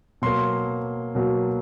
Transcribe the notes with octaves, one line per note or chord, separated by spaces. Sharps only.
B2 F#3 A#3 C6
B2 F#3 A#3